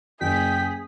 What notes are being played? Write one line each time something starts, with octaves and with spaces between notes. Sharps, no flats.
F#1 G#4 G5 B6